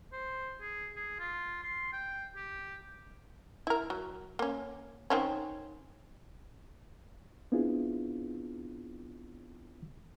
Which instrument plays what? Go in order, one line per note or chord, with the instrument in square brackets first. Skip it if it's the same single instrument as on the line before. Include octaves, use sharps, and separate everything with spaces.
[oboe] C5
G#4
G#4
F4
C6
G5
G4
[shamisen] E4 A#4
F#3
A#3 C#4
D#3 C4 C#4
[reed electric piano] B3 C4 D4 E4 F4 G#4